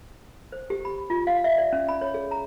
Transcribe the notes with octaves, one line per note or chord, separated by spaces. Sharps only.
C5
G4
B5
F4
F5
E5
D5
C#4
B5
C#5
G#4
A#5